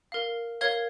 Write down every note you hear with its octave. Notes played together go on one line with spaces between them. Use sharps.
A#4 F5
A#4 C#5 F5 G#6